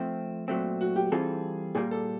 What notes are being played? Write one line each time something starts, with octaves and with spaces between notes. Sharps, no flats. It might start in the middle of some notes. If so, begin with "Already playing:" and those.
Already playing: F3 A3 C4
A#2 F#3 A3 C4
F#4
G4
E3 G3 C4 F4 G#4 A4
A#2 G3 A#3 G#4
A4